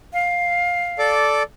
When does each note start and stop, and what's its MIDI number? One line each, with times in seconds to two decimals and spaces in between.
0.13 1.14 77
0.99 1.43 69
0.99 1.43 74
0.99 1.43 86